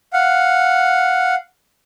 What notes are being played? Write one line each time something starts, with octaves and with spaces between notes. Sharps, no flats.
F5 F#5